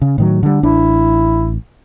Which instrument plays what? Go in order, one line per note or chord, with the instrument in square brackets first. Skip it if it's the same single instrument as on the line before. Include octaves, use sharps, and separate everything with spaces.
[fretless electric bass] C#3
A2 D#3 F#3
D3 G3
[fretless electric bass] A1 D4 [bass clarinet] E4